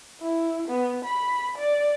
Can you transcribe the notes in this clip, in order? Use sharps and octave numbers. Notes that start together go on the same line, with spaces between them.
E4
B3
B5
D5